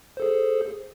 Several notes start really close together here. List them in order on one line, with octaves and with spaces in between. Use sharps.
C5 A4 G#4